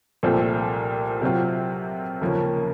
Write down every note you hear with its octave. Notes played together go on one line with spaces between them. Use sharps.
C2 A#2 F3 A3 C4
C3 F#3 C4 F4
D#2 C#3 F3 A#3 C#4